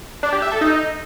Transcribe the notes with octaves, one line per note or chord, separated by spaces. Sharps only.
D4
G4
E5
A4
D#4